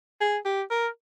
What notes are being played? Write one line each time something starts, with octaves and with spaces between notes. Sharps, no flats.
G#4
G4
A#4